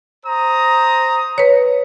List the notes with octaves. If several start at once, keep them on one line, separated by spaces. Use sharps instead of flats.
C5 A#5 D#6
B4 C#5